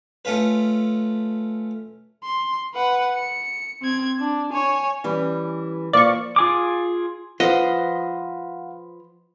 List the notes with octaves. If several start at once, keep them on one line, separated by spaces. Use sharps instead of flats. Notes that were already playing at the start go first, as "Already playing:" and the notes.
A3 C#4 F4 B4
C6
B4 F#5
C#7
C4 G#6
D4
C#5 G#5
E3 G3 C#4
F3 A#3 D5 C#6
F4 G#4 D6
F3 B4 C5 D#5 F5 F#5